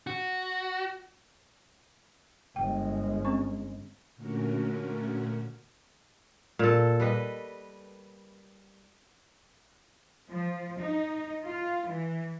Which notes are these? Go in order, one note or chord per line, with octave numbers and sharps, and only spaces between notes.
F#4
G1 G#3 G5
C4 C#4 C#6
A#2 D3 A3 C#4 F#4 A#4
A#2 A4
G3 B4 D#5
F3
D#4
F4
E3